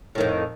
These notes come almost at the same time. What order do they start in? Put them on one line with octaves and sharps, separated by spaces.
A2 D#3 F2